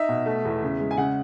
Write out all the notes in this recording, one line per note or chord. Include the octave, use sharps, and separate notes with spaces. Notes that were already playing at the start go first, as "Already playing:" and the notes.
Already playing: D#4 E5
B2
A3
E2
C#3
G#3
G#5
C#3 F#5